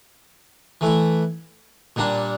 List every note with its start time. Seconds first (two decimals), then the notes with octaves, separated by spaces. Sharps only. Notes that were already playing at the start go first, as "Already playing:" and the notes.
0.81 E3 A3 E4
1.96 A#2 G3 A#3 D4